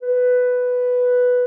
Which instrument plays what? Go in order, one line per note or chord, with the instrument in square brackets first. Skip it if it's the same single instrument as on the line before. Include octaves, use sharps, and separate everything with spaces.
[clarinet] B4